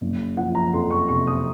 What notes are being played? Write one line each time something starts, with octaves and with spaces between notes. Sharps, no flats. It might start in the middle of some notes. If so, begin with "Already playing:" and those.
F#1
F3 F#5
A#5
F2 C6
C#6
C3 C#6
D#6